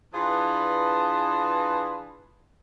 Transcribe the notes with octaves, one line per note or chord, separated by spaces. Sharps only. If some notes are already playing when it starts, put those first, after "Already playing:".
E3 D4 F4 G#4 B4 A5